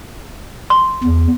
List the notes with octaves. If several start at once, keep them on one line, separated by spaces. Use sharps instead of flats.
C6
E2